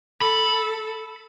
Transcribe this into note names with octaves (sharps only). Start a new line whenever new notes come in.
A4 B5